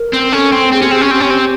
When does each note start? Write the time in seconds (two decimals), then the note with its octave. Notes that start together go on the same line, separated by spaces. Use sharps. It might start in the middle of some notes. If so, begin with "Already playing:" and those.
Already playing: A#4
0.13 C4
0.32 C#4 A4
0.52 C4
0.72 C4 G#4
0.80 C#4 G4
0.88 C4 G#4
1.01 C#4
1.11 C4 G4
1.20 C#4
1.30 C4